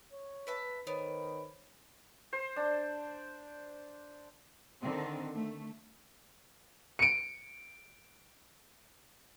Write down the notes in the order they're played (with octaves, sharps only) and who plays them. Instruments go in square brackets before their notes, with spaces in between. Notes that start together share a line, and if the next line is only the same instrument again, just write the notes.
[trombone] C#5
[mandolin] B4 E5 A5
[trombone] D#3 [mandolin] B3 [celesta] C5 C#5 D7
[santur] C5
D4
[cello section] D3 D#3 C4
A3
[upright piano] C#7 D7